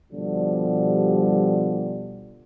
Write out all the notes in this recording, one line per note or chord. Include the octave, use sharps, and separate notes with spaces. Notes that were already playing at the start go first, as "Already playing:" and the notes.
B2 D3 F3 G3